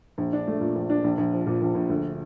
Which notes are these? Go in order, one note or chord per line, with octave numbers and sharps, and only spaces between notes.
A#1
D4
A3
A#2
A#1
D4
A#1
A#1
F3
A#2
A#1
A#1
D2